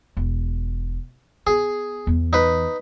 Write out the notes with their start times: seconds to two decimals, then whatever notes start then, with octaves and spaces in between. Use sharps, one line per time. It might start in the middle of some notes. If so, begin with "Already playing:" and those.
0.17 E1
1.47 B3 G#4
2.07 E2 E3
2.33 D#4 B4